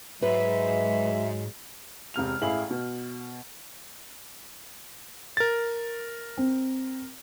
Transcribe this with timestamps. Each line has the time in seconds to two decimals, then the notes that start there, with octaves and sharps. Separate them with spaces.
0.22 G#2 F#3 G#3 B4 E5
2.14 E1 C3 F6 F7
2.42 A1 A2 E4 G#4 F5 F#7
2.71 B2
5.37 A#4 A6
6.37 C4